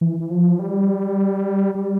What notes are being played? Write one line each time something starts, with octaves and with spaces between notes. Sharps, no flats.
E3
E3
F3
G3
G3